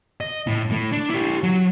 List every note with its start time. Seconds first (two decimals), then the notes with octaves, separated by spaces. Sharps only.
0.21 D#5
0.47 A2
0.71 A2 A3
0.92 D4
1.10 E4 G4
1.43 F#3